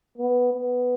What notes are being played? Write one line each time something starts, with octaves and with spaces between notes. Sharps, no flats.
B3
B3